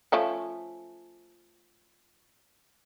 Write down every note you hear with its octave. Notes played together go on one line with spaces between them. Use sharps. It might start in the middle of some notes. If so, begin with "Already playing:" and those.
F3 A3 C#4